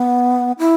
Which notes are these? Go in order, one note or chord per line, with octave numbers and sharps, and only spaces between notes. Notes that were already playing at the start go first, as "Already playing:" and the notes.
Already playing: B3
E4